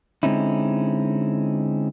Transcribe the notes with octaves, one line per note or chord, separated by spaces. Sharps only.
D3 G#3 C4 C#4 D#4 E4